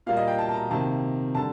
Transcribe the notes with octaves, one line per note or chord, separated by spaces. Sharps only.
A#2 G3 A#3 F5
D#5
G5
A5
A5
A#5
C3 D#3 A#3 A5
D3 G3 A5